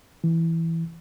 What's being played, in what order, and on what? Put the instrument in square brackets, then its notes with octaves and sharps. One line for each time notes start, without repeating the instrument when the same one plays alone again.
[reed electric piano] E3